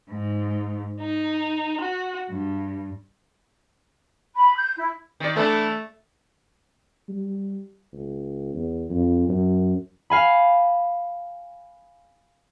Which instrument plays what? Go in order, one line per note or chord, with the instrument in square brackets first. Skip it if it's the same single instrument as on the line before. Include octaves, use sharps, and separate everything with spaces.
[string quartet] G#2
D#4
F#4
G2
[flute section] B5
G6
E4
[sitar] D#3 D5
[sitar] E3 D4 [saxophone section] A3
[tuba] G3
C#2
E2
F2
F#2
[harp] F5 G#5 B5